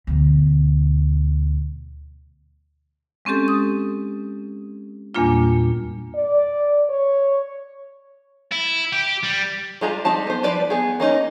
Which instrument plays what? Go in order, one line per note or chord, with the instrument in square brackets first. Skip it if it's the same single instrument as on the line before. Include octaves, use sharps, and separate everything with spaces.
[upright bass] D2 B2
[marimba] G#3 C4 C#4 G4 A4
D#6
E2 A#2 G3 A#3 D4 F4
[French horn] D5
C#5
[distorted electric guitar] E4
G4
G3
[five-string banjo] G3 G#3 F4 A#5
G3 C4 D#4 A5
B3 C5
F3 G3 B4 D5
B3 G#4
A#3 C#4 D#4